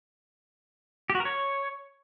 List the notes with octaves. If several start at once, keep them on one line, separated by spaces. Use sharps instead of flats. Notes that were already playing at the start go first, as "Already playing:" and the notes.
G4
F#4
A#4
C#5